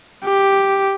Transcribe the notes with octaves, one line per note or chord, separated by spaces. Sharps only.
G4